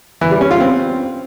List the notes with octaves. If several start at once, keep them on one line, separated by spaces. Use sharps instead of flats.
E3
G3
C#4
F4
C4